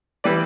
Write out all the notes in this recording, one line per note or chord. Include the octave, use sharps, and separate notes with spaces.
E3 G3 B4 D5